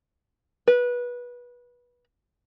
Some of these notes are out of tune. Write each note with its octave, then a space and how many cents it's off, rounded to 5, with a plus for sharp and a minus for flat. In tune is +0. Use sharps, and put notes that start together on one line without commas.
B4 -20